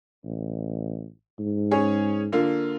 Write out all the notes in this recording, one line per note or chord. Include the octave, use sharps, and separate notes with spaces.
A1
G#2
C#4 G#4 C#5
D3 A#3 F4